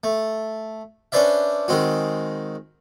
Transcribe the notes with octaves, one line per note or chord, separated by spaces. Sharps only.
A3
C#4 D4 B4 C5 D5 E5
D#3 G#3 C4 F#4